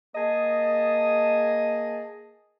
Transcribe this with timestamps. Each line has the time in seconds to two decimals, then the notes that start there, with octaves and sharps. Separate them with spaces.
0.15 A#3 G#4 D#5 A5